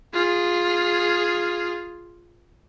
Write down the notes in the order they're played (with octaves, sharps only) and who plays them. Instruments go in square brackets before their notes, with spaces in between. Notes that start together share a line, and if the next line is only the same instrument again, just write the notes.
[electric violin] F4 G#4